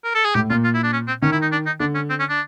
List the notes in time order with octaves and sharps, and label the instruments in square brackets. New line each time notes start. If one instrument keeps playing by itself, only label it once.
[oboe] A#4
A4
G#4
[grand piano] A2 [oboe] G4
[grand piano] A#2 [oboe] F4
[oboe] F4
E4
D4
C#4
C4
[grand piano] D#3 [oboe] C#4
[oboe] E4
D#4
D4
D#4
[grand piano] D3 [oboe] D4
[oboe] C#4
C4
C#4
D4